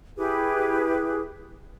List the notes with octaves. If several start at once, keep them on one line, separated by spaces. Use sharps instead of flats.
E4 G4 G#4 B4